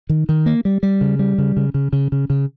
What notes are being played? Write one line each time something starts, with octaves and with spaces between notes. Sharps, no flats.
D#3
D#3
A#3
G3
G3
C#3
G3
C#3
C#3
C#3
C#3
C#3
C#3